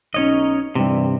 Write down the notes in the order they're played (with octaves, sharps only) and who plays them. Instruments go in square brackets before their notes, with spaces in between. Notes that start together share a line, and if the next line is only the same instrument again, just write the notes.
[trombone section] B1 D#4 [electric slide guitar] C#4 C#5 D#5
[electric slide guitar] G2 C3 [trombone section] E3 G3